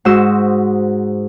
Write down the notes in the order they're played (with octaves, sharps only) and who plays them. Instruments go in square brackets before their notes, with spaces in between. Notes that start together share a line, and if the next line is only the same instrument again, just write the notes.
[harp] G#2 F#4 C5 D#6 E6